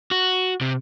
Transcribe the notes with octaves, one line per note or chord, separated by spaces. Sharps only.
F#4
C3